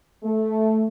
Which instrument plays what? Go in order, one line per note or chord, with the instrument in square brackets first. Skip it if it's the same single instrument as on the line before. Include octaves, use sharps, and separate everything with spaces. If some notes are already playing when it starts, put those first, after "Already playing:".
[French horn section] A3